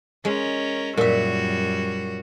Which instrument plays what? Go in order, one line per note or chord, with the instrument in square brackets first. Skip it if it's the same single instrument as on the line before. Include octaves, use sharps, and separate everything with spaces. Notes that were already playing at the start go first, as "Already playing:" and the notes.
[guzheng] G#3 [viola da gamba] C#4 A#4
[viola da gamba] F#2 G3 F#4 [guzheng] A#2 E5